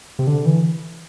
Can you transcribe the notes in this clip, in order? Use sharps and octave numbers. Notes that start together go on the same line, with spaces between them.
C3
D3
E3